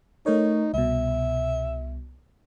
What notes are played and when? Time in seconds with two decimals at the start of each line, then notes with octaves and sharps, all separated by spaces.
0.26 A3 D#4 A#4 C#5
0.74 C2 B2 E5